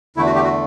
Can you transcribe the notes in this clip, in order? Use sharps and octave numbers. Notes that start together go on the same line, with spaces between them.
E2 D3 A3 E4
F#4
G4
F#4